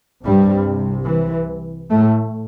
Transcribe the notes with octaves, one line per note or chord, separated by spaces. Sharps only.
C2 G2 C3 G3
E3
A2 A3